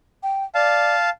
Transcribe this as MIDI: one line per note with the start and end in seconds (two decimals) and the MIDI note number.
0.23 0.44 79
0.55 0.96 74
0.55 1.10 77
0.55 1.10 81